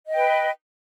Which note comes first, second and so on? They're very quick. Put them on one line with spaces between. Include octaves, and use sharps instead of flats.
D#5 G5 B4